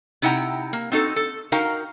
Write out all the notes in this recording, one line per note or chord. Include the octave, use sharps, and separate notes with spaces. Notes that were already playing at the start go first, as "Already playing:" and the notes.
C3 D#4 E4 F#5 G5 A#5
A#3
C4 D#4 F#4 A4
A4
D#4 F#4 A#4 F5 G5 A#5